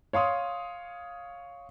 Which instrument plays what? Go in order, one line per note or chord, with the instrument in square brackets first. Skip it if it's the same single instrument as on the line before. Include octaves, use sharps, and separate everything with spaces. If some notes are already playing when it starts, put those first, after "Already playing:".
[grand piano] C#5 F5 C6 D#6